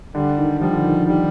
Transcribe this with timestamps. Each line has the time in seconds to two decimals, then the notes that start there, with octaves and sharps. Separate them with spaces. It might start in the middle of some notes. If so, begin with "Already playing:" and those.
0.14 D3 G3
0.38 D#3
0.61 F3 G3
0.73 D3
0.84 D#3
1.07 D#3 G3